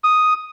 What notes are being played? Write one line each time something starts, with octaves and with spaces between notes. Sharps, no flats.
D#6